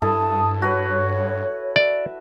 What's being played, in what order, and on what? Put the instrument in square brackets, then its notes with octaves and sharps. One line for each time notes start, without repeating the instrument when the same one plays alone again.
[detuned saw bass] G2 [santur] E4 A4 [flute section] A5 D#6
[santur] F#4 B4 [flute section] C#5
[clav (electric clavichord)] D5 [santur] E5